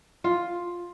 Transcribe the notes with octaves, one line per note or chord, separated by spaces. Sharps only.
F4